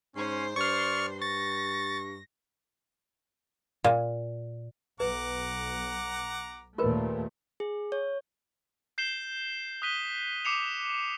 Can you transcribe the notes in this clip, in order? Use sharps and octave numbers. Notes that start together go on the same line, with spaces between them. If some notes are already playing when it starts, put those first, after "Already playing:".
G#2 C#4 C5 C6
G2 D5 C#6 F6
C#6 A6 A#6
A#2
B1 B4 F#5 A#5 D6
D#2 A#2 A3 F4 A#4 B4
G#4
C#5
G6 C7 E7 G7
D#6 F#6 B6 D#7 G7
D6 C7 C#7 E7 F7